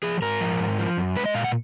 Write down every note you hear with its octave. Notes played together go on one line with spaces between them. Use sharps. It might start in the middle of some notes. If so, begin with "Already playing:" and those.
F3 G#4
G#2 A#4
F3
G#2
F3
F#2
G#3 B4
D#5
A#2 F5
F#5